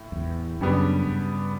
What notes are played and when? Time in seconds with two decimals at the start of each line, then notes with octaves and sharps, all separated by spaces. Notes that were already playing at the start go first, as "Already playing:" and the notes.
Already playing: A2
0.12 F#2
0.16 E2
0.61 F#2 C#3 G3 B3 D4
1.06 G2